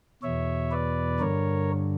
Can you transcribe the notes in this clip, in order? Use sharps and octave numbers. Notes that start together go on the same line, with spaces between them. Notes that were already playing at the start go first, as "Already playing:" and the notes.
E2 B2 C#5 E5
B4 D5
G2 D3 A#4 C#5